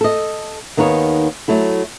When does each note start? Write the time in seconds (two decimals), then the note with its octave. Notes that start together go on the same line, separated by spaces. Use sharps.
0.01 A4 D#5
0.77 D#2 D#3 B3 D#4 A#4 C#5
1.48 F#3 A3 E4